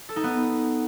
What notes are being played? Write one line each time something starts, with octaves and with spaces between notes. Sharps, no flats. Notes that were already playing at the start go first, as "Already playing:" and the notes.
A4
D#4
B3